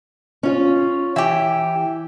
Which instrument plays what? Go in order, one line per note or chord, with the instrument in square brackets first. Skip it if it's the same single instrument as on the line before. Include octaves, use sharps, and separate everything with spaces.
[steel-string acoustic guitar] C#4 F4 C#5
[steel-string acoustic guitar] E3 [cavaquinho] E4 G4